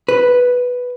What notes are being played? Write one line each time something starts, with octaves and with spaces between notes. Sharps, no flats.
B4